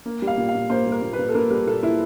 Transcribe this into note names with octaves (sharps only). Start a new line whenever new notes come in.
A#3
G3
F5
A#2
F5
A#2
A#3 C5
G3
A#4
A#2
B4
A#2
A4
A#3 A#4
G3 A#4
A#2 A4
A#2 E4